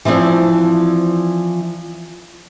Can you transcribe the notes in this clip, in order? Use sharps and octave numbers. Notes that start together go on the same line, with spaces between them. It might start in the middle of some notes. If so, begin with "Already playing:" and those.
E3 F3 C4 D4